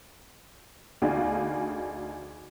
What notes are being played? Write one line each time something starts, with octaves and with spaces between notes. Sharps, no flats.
D2 D4 D#4 G#4 F5